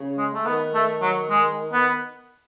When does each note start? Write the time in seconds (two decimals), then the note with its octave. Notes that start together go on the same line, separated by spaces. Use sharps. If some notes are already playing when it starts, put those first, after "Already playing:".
Already playing: C#3
0.18 G#3
0.34 A3
0.46 D#3 B3
0.74 A3
1.02 F#3
1.30 G#3
1.73 B3